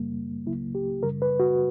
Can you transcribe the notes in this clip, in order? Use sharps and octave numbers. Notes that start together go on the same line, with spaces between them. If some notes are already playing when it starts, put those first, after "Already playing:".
Already playing: F#2 C#3 G3 A#3
C#2 C#3 F#3 A#3 E4
G4
F#2 C#3 G3 A#4
B4
F#4